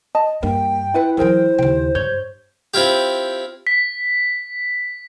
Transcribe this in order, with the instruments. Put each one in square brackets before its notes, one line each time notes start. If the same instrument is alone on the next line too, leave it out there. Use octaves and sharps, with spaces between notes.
[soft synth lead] D#5 [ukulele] A5
[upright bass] G2 [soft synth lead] A#3 [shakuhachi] G5
[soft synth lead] E4 [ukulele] F4 B4 F#5
[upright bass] E3 F#3 [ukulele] G#4 A#4 G5 [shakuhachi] C5
[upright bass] D#2 C#3 [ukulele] G5
[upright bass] G2 [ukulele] C#5 [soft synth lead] G6
[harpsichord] C4 E4 F4 G4
[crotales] B6